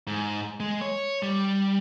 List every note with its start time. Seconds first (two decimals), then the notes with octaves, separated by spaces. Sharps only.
0.07 G#2
0.60 G#3
0.81 C#5
1.23 G3